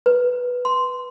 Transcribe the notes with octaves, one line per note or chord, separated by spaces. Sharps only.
B4
C6